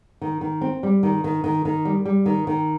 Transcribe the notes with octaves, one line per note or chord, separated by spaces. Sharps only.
D#3
D#3
C4
G3
D#3
D#3
D#3
D#3
G3
G3
D#3
D#3